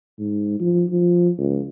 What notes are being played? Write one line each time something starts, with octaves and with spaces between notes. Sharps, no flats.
G#2
F3
F3
C#2